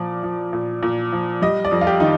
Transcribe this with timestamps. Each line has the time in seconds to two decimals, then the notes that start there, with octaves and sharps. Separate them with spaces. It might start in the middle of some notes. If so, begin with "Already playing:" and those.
Already playing: A#2 F3 D5
0.23 F3
0.53 A#2
0.83 A#2
1.12 F3
1.42 G3 D#5
1.65 D5
1.71 F2
1.81 F4
1.87 G4
2.00 D#3 D#4